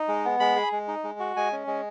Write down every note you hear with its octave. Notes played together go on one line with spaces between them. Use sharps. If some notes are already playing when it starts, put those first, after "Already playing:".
Already playing: D#4
G#3
B3
G#3 B5
G#4
G#3
D#4
G#3
F#4
G#3 G#5
C#4
G#3